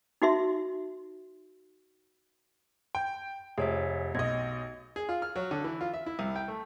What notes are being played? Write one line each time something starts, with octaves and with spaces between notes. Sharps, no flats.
D#4 F#4 E5 C6
G5
F1 G#4 C#5 E5
B1 D#5 G#6
G#4
F4
F6
F#3
D3
E3
F4
E5
E4
C2
G5
A3